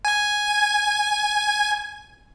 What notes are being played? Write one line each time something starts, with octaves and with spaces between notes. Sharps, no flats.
G#5 G#6